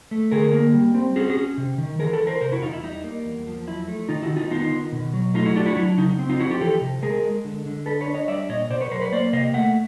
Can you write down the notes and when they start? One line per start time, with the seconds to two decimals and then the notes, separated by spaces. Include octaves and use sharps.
0.11 A3
0.31 D3 G#4 A#4
0.52 A#3
0.74 G3
0.94 C4
1.16 C#4 F#4 G#4
1.30 F#4 G#4
1.37 C#4
1.57 C3
1.78 D#3
1.99 E3 G#4 A#4
2.13 A4 B4
2.20 E3
2.27 A#4 C5
2.41 C3 A#4 C5
2.52 E4 F#4
2.62 E2 D#4 F4
2.73 E4
2.83 G3 D#4
3.04 A#3
3.25 E2
3.47 F3
3.67 F#3 E4
3.88 A3
4.09 D#3 D#4 F4
4.23 E4 F#4
4.30 D#3
4.37 D#4 F4
4.50 B3 D#4 F4
4.72 D#3
4.93 B2
5.13 F#3
5.34 A3 D#4 F4
5.45 E4 F#4
5.56 D4 F4 G4
5.66 E4 F#4
5.77 F#3 E4
5.98 C#3 D#4
6.19 C4
6.29 D#4 F4
6.40 F3 E4 F#4
6.51 F4 G4
6.61 E3 G4 A4
6.81 C3
7.02 G#3 G#4 A#4
7.23 G#3
7.45 D3
7.66 D3
7.86 D4 A4 B4
8.01 B4 C#5
8.08 D4
8.14 C#5 D#5
8.28 G3 D5 E5
8.49 A#2 C#5 D#5
8.70 B2 C5 D5
8.81 B4 C#5
8.91 F#3 A#4 C5
9.01 B4 C#5
9.12 A#3 C5 D5
9.33 C3 D#5 F5
9.54 A3 E5 F#5